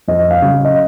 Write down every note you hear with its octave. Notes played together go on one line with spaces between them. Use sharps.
F2 D#5
F5
C#3 F#3
D#5